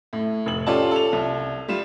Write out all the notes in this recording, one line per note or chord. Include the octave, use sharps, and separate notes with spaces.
A2
F1 F#7
C#4 F4 G4 A4 D5 A5
A4 F7
C2
G3 F4 E7